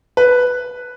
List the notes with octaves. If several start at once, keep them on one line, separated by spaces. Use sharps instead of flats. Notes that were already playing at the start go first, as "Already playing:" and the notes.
B4